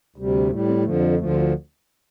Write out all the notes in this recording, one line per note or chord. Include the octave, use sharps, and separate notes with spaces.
D2 C3 G3
A2 G3 A3
C4
F2 D3 F3 A3
G3
D2 D3 F3 A3
F4